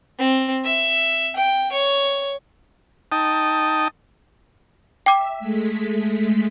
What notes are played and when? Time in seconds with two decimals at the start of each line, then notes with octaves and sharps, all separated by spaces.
0.18 C4
0.64 E5
1.36 G5
1.72 C#5
3.12 D#4 G5 A5 D#6
5.06 E5 G5 D6
5.39 G#3 A3 B6